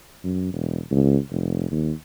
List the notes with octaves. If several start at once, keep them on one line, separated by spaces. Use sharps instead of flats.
F#2
E1
C#2
F1
D#2